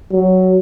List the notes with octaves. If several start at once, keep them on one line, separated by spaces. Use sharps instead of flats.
F#3